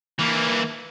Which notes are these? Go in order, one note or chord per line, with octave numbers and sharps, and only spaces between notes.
E3 A#3